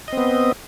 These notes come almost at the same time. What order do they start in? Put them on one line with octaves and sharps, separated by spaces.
D#5 C4 B3